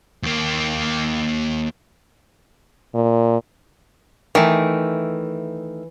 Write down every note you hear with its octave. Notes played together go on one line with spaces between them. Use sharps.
D#2 A#3
A#2
D#3 E3 A3